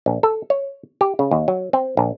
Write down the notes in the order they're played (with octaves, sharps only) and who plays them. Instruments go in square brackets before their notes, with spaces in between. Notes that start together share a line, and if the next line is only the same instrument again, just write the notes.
[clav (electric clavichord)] A#1
A4
C#5
G4
C#3
D#2
F#3
C4
A#1